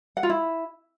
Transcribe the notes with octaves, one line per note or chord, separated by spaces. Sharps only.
F#5
F4
E4